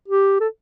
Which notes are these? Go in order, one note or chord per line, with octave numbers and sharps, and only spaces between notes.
G4
A4